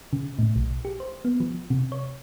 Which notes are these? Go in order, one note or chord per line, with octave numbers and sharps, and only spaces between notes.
C#3
A2
B1
G4
C5
B3
F3
C3
C#5